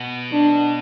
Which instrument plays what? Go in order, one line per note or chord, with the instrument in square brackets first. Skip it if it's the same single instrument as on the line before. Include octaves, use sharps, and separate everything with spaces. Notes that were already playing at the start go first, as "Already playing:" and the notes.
Already playing: [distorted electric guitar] B2
[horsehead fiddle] D4